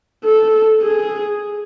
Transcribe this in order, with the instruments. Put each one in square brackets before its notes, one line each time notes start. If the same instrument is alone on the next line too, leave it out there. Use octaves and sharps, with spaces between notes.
[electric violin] A4
G#4